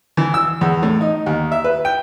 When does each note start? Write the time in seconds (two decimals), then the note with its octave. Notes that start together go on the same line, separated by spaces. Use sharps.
0.17 E3
0.34 E6
0.61 E2
0.83 A2
1.01 D#4
1.26 D#2
1.52 E5
1.64 B4
1.85 G5